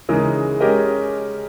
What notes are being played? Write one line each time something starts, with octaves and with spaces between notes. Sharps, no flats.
C#3 E3 G#3 D#4 A#4
G#3 C#4 G4 A#4 D#5